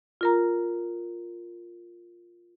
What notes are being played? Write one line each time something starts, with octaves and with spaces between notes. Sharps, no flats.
F4 A#4 A#5